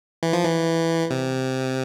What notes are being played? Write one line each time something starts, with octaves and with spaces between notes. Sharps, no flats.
E3
F3
E3
C3